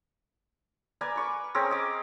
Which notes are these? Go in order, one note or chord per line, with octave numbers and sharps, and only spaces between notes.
A#4 B4 D5 G#5
B5 C#6 D6
C4 C#4 G#4 A#4
D#5 D6